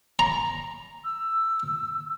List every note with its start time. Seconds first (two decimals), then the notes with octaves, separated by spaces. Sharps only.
0.19 A#5
1.04 E6